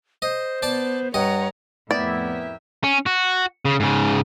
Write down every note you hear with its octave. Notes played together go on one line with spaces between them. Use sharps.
C5 D#5
B3 D5 A5
G2 C#5 D#5 F#5 A#5
F2 A2 B3 E4 G4 A#4 D5 E5
C#4
F#4
C#3
G#2 C#3